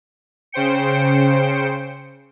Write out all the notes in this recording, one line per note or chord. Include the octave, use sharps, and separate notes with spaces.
C#3 C5 G5 C#7